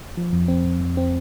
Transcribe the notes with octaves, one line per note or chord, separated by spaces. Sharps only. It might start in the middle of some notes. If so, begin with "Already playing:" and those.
F3
F2
C4
F2
F2
C4